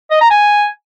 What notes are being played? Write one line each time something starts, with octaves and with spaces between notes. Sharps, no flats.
D#5
A#5
G#5